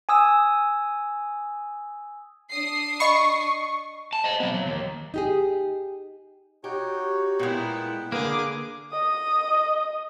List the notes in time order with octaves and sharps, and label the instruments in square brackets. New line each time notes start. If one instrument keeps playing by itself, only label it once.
[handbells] G#5 D#6 E6
[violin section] D4 D#6 C7
[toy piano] D#5 B5 [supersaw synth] C#6
[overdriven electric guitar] A5
C5 D#5
F#3 B3
F#3
D#2
[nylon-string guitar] D#4 G4 G#4
[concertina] D#4 F#4 C#5 [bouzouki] G4
[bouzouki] A#2 G#3 [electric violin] B3 E4 [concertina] F#5 G5
[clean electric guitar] D3 A#3 [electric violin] G#4 D6 [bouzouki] B4
[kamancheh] D#5 D#6